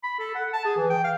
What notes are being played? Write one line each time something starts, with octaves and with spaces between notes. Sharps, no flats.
B5
A4
F#5
A5
G#4
E3
G5
F5